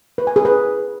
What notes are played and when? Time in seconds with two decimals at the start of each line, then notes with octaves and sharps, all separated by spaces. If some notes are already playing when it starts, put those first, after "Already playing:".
0.18 B4
0.27 G#5
0.36 G#4
0.45 B4